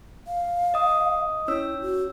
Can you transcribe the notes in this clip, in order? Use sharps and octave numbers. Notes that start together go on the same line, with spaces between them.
F5
D#5 D#6
C#4 E4 C#5 E6
F#4